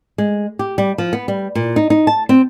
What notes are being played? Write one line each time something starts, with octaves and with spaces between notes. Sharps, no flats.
G#3
G4
G3
F3
B3
G3
A#2
D#4
D#4
A5
C4